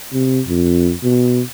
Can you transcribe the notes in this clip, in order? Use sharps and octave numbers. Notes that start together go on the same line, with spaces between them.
C3
F2
B2